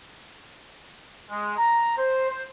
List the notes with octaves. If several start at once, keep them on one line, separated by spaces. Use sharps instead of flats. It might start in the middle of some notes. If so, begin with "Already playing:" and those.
G#3
A#5
C5
C5